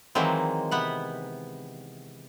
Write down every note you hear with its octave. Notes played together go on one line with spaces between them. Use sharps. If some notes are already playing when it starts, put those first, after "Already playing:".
D#3 E3 F#3 G#3 A#3 C4
C3 B3 F#5